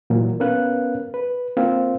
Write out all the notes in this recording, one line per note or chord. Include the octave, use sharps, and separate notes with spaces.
A#2 E3 F#3 A#3
B3 C#4 A#4 B4 F5 F#6
B4
A#3 C4 F4 C5 F5